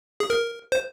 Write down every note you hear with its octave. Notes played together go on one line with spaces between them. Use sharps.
G#4
A#4
C5